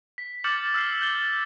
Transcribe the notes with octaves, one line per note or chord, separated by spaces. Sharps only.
B6
D6 F6 G6 A6 C#7 F#7
E6 F6 B6 C7
G6 A6 G7